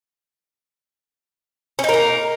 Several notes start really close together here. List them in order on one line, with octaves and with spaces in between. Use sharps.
C#4 D#4 A#4 A#3